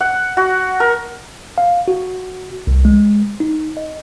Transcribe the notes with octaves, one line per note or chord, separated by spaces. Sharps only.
F#5
F#4
A#4
F5
F#4
C2
G#3
D#4
D#5